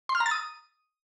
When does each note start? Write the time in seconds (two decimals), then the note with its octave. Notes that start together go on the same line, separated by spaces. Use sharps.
0.09 C6
0.15 F6
0.20 A#5
0.26 A6
0.31 D#6